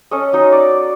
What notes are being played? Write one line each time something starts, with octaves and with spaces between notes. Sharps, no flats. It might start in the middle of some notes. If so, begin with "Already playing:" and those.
C#4 A4 D#5
F#3 D#4 D#5
D5